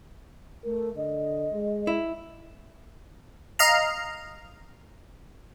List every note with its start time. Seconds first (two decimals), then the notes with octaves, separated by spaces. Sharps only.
0.65 A3 A#4
0.96 D3 D#5
1.53 G#3
1.87 E4
3.59 D#5 F5 A#5